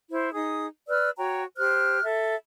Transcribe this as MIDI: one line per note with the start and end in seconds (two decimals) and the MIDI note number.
0.11 0.32 64
0.11 0.32 72
0.33 0.66 63
0.33 0.66 68
0.33 0.66 87
0.88 1.10 71
0.88 1.10 74
0.88 1.10 88
0.88 1.10 89
1.17 1.43 66
1.17 1.43 73
1.17 1.43 79
1.17 1.43 82
1.57 2.02 67
1.57 2.02 72
1.57 2.02 89
1.57 2.02 90
2.03 2.35 69
2.03 2.35 76